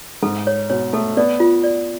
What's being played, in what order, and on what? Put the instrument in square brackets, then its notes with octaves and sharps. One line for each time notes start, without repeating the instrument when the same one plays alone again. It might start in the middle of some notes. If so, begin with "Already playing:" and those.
[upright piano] G#2 [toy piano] A4
[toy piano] C#5
[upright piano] B2 [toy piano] C#5
[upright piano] A3 [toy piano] A4
[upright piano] B3 [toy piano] D5
[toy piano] F4
D5